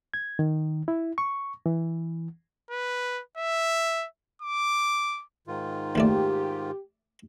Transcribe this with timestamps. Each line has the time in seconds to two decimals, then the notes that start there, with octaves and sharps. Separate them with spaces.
0.14 G#6
0.39 D#3
0.88 E4
1.18 C#6
1.66 E3
2.71 B4
3.38 E5
4.42 D6
5.47 G#2 D#3 F4
5.95 D#2 A3 G4 D5